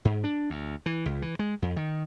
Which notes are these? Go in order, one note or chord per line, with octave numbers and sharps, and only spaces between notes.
G#2
D4
D2
E3
C#2
E3
G#3
F2
D#3